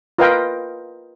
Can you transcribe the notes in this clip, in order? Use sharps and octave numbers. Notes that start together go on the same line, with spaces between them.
F4 A#4 B4 D#5 F5 G5